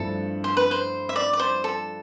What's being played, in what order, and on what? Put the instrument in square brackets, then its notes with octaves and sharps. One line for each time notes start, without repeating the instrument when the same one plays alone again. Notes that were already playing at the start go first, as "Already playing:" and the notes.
Already playing: [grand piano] G2 F3 A3 C4 E4 [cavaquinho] A4
[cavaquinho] C5
B4
C5
E5
D5
D5
C5
A4